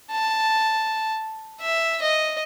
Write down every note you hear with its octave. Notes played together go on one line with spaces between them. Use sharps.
A5
E5
D#5